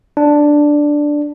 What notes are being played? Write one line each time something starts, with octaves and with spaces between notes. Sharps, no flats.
D4